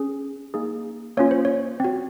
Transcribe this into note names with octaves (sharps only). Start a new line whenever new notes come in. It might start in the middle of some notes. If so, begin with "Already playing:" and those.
Already playing: C#4 G#4
A#3 D#4 G#4
A#3 C#4 F4 C#5
C5
C#5
C4 F#4